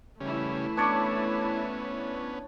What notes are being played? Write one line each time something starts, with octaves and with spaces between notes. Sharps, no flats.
C#3 E3 G3 A3 C#4 E4
B3 C#4 D4 C#5 D5